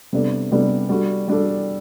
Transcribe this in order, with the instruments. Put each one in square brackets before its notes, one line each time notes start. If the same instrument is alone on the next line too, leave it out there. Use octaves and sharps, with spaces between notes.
[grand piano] C3 G3 B3 D4 A4
C3 G3 B3 D4 A4
G3 D4 F#4 A4
G3 D4 F#4 A4